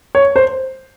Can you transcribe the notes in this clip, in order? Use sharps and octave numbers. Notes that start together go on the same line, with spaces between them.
C#5
C5